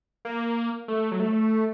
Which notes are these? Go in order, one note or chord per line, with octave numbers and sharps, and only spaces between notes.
A#3
A3
F#3
A3